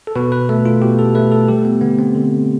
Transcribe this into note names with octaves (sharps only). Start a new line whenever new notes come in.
A4
B2 B4
B4
A3 A4
F4
B2 G4
A4
A3 B4
A4
G3 G4
B3
D3 B3
C4
D3